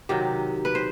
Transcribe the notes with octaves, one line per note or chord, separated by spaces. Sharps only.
C3 D#3 F#3 G4
B4
C5